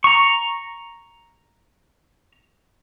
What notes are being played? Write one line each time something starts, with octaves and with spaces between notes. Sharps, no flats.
A#5 C#6